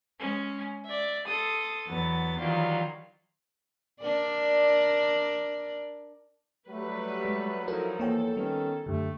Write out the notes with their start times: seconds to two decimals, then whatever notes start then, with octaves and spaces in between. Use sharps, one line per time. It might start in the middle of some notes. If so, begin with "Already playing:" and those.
0.20 G#3 C#4
0.85 D5 E5
1.26 A4 C6 D#6
1.87 E2 F#3 B3 A6
2.39 D#3 E3 F#3 G3 F4
4.01 D4 A#4 D5
6.69 F#3 G3 A3 B4
7.25 G#3
7.68 F3 D#4 E4 F#4 A4 A#4
8.00 E2 A#3 A4 C#5 G5
8.37 D#3 G3 B3 C#4
8.86 F#2 D3 A3 G4